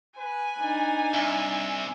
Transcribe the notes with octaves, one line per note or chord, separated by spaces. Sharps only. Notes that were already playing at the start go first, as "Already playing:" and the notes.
B4 G#5
D4 D#4
C2 E5